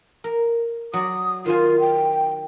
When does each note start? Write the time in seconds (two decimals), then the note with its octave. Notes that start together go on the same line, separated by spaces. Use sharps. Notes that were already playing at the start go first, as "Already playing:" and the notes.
0.24 A#4
0.94 F#3 D5 D#6
1.46 D#3 F4 C5 G#5
1.80 G5